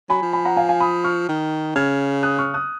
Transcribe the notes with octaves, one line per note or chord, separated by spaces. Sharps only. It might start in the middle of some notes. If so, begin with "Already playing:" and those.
F#3 G#5 B5
F3
G#5 B5
F#5 A#5
F5 G#5
F5 G#5
B5 D#6
C#6 F6
D#3
C#3 F6 G#6
D#6 F#6
C#6 F6
D#6 F#6